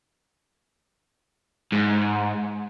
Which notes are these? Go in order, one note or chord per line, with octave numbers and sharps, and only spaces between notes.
G#2